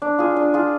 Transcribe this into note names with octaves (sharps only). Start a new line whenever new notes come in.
D4
F4 G#4
D4
F4 G#4